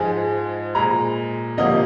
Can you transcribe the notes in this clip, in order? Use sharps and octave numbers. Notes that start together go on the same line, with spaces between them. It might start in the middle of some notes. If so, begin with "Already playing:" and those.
Already playing: G#2 F3 G#3 G#5
A#2 G#3 A#5
D2 C3 F3 A#3 D#5